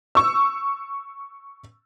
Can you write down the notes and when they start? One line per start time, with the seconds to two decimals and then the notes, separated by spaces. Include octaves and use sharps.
0.15 C#6 E6